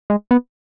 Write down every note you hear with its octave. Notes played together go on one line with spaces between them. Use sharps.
G#3
B3